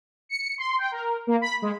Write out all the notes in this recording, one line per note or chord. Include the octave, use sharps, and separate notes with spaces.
C#7
C6
G5
A#4
A#3
B5
G#3